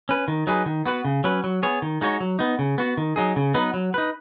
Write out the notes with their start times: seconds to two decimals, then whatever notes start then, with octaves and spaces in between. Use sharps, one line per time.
0.09 C#4 B4
0.28 D#3
0.47 F#3 D#4 G#4 B4
0.66 D#3
0.86 B3 F#4 B4
1.05 C#3
1.24 F#3 C#4 B4
1.44 F#3
1.63 B3 G#4 C#5
1.82 D#3
2.01 G#3 D#4 F#4 C#5
2.20 F#3
2.39 B3 D#4
2.59 C#3
2.78 B3 F#4
2.97 D#3
3.16 F#3 D#4 G#4
3.36 C#3
3.54 F#3 B3 D#4 B4
3.74 F#3
3.94 D#4 B4